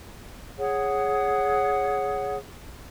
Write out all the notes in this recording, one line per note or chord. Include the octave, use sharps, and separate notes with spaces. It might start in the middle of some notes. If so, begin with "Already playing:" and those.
G#4 C#5 F#5